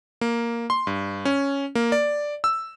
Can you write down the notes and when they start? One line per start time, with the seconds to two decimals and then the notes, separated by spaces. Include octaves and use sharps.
0.21 A#3
0.70 C6
0.87 G2
1.25 C#4
1.75 A#3
1.92 D5
2.44 E6